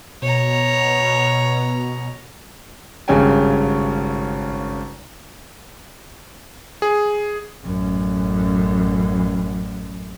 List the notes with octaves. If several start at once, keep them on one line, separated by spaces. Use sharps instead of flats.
B2 C#5 A#5
G#1 G2 C#3 C#4 G5 G#5
G#4
A1 F#2